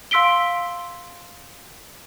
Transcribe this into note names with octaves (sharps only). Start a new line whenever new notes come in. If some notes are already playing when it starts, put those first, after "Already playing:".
F5 C6 E6 B6 D7 G7